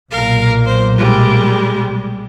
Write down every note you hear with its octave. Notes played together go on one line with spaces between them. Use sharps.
B1 A#2 A#4 F5
C5
G3 G#3